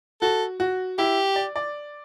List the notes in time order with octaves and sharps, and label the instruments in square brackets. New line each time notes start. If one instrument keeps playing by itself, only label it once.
[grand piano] F#4 [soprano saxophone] A4
[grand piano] F#4
[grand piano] E4 [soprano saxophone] G4
[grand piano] D5
D5